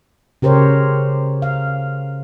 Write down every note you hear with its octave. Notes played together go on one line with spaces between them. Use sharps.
C#3 G4 A#4 C5 C#5
F5